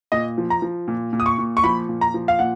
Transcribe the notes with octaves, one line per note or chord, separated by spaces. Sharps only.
A#2 D#5
F3
A#5
F3
A#2
A#2
D#6
C#6
A#2
C#6
F3 B5
A#2
A#5
F3
F5
A#2 F#5